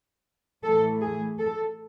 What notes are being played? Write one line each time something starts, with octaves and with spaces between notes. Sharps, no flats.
A2 E3 A3 A4
G#4
A4